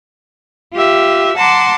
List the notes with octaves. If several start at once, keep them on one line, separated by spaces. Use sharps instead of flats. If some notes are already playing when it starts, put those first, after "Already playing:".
F4 G4 E5
F#5 A5 A#5 C6 D6